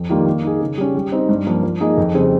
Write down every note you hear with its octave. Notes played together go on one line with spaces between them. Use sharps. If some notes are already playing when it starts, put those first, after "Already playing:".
Already playing: F2
D#3 G3 A#3 F4
A#3
D#4 G#4
C#3
G3 C#4
G3
C4 D#4
G2
F3 A#3
F3
A#3 D#4 G#4 D#5
F2
C#3 G3 C4